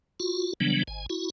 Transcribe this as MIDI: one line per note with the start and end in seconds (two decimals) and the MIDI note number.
0.20 0.53 65
0.20 0.53 66
0.60 0.83 49
0.60 0.83 52
0.60 0.83 54
0.60 0.83 55
0.60 0.83 59
0.60 0.83 62
0.88 1.06 32
0.88 1.06 80
1.10 1.30 64
1.10 1.30 66